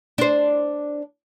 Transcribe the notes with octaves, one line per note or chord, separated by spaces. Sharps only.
D4 C5